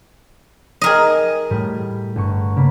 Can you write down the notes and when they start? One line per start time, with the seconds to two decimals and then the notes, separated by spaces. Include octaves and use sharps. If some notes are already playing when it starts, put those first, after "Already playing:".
0.82 G#4 A#4 D#5
1.50 A2 G3
2.16 G1 C#6
2.56 C#3 A#3 B5